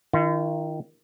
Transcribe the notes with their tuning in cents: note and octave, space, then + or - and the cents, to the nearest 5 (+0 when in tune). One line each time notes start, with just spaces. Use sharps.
D#3 +0 F4 -45